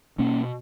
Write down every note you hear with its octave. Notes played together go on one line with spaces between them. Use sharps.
B2 A#3 C#4